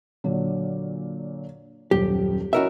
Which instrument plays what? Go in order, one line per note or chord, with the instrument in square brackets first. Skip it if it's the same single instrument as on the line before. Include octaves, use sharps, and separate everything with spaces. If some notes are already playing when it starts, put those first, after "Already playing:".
[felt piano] A#2 D3 F#3
[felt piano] D#1 F#2 [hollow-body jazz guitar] G4
[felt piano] C#4 E4 D#5 [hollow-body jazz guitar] F#4 A#4 E5